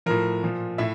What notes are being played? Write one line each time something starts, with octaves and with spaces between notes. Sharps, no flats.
A2 F3 A#4
A#2 F3
A2 E4 E5